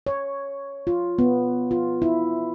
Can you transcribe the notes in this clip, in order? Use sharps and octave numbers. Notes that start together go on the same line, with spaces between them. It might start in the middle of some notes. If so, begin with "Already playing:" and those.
C#5
F4
B3
F4
E4